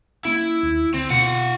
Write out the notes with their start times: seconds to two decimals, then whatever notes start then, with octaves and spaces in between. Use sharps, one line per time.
0.25 A#3 C#4 E4
0.63 D#2
0.94 D2 C4
1.10 B2 F4 F#5